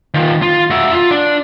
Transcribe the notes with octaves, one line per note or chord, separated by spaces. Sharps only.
D#3 F4
F4
F#4 E5
F4
D4